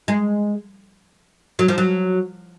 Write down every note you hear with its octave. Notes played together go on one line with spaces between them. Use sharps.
G#3
F#3
F3
F#3